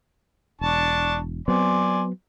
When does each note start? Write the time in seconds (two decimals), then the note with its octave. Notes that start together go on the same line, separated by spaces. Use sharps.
0.61 E1 D4 A5 C#6
1.48 F#3 B3 C4 D5 G#5 C6